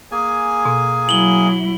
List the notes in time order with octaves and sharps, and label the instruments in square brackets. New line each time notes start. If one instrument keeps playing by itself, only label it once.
[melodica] A#3 G#4 G#5
[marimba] B2
[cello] F#3 E4 [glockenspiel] F#7 G7